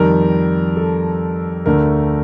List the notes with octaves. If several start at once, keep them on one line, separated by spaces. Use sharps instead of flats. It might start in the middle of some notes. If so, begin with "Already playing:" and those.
Already playing: F2 D#3 G3 A#4
A4
D2 D3 A3 A#4